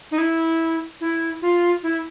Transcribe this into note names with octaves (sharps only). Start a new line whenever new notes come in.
D#4
E4
E4
F4
E4